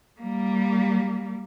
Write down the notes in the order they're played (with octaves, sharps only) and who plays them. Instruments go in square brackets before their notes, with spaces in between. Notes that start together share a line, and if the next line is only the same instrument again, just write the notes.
[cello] G3 A#3